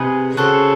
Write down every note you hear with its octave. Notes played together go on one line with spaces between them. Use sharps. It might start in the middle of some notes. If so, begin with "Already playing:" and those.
Already playing: C3 D#4 G#4 B4
C#3 F#4 A4 C5